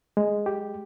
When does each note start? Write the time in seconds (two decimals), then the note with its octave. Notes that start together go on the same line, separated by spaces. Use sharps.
0.17 G#3
0.46 G4